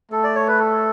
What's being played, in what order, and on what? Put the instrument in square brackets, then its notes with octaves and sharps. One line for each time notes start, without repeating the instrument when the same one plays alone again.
[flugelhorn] A3 [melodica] A4
[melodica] D5
C#5
B4
A4